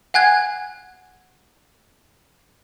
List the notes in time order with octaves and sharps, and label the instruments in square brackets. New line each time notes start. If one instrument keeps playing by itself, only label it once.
[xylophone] F#5 G#5 F#6 G#6